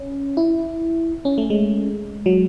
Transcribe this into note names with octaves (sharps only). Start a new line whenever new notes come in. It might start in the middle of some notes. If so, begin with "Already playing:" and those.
Already playing: C#4
E4
C#4
A3
G#3
F#3